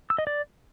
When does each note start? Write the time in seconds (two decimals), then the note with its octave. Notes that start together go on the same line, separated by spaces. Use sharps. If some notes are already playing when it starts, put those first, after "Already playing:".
0.10 E6
0.18 D#5
0.27 D5